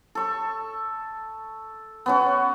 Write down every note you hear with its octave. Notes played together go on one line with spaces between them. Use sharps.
A4 C#6
B3 C#4 F#4